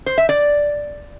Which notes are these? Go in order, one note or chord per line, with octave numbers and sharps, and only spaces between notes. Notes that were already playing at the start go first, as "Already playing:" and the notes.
C5
E5
D5